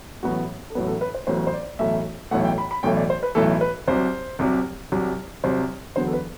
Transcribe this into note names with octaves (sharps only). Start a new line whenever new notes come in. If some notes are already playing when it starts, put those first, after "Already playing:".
A1 A2 F#3 B3 F#4
A4
A1 A2 F#3 B3 B4
A4
B4
C5
A1 A2 F#3 B3 C5
C5
D5
B1 A2 E3 A3 E5
B1 A2 E3 A3 F#5
G5
B5
B5
B1 A2 E3 A3 G5
D5
C5
B4
B1 A2 E3 A3 A4
B4
C2 C3 F#3 C5
C2 C3 F#3
C2 C3 F#3
C2 C3 F#3 C5
E2 D3 F#3 B3 C5
A4
B4